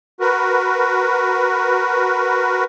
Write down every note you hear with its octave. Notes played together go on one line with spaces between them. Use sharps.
F#4 A#4 B4